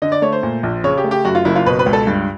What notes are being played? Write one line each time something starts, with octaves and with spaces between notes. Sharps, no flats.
D3 D#5
D5
A3 C#5
C5
A#2
A#1
C#3 C#5
G4
A3
G4
F#2 F#4
F4
F#1 E4
F4
B2 B4
B4
C#2
A4
G2